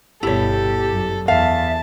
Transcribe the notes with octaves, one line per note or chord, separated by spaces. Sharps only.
G1 B2 E4 G4 A4 C#5
F#2
E2 E5 F5 A5